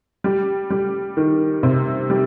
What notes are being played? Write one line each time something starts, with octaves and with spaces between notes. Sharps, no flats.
G3
G3
D#3
C3
G3